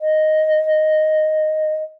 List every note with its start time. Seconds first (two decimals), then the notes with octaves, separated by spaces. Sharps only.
0.01 D#5